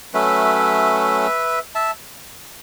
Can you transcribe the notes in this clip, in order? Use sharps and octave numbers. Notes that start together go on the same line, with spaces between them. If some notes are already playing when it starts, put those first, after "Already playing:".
F#3 A3 C#4 B4 E5
E5 A5